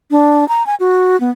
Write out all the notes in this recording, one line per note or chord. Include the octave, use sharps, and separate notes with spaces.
D4
A#5
G#5
F#4
B3